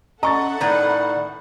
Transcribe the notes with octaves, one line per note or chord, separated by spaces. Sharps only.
C#4 A4 D#5 E5 F#5 A#5 C#6 A6
A2 D#3 B4 D5